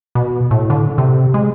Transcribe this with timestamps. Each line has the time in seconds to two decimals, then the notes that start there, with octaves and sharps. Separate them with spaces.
0.15 B2
0.51 A2
0.70 D3
0.98 C3
1.34 G#3